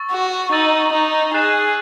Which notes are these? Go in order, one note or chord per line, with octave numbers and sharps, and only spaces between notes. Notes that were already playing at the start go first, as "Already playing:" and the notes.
Already playing: C#6 E6 A6
F#4
D#4 E6 A6 D#7 F#7
D#4
G#4 F#6 A6 C7 E7